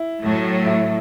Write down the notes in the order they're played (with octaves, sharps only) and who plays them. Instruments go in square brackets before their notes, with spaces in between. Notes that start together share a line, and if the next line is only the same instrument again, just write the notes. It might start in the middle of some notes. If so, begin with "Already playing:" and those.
Already playing: [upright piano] E4
[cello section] A2 F#3 A3
[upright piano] E4